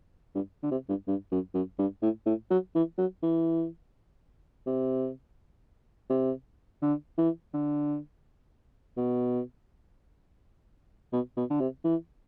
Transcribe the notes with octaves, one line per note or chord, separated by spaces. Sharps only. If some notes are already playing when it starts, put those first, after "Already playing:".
G2
D3
C3
G2
G2
F#2
F#2
G2
A2
A2
F#3
E3
F#3
E3
C3
C3
D3
E3
D3
B2
B2
B2
D3
C3
E3